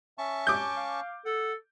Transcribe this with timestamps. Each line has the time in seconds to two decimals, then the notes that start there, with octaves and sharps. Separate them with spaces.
0.18 C#4 E5 A5 C#6
0.47 D6 G6
0.76 F5
1.25 A4 F#5